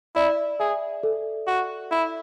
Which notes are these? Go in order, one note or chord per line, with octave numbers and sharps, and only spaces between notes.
E4 D5
G#4 E5
A4
F#4
E4